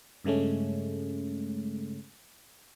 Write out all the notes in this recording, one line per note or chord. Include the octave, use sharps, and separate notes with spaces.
G2 C#3 G#3 A3 C#4